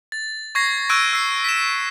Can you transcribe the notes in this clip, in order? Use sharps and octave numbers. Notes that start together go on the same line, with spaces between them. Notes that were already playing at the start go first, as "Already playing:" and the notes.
A6
C#6 G#6 A#6 C7
C#6 E6 F#6 G#6 D7 D#7
E6 C7
B6 E7